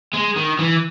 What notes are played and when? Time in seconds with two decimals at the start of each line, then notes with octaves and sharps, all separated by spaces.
0.13 G#3
0.36 D#3
0.59 E3